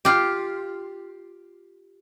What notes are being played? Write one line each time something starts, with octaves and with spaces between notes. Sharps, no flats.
F4 G4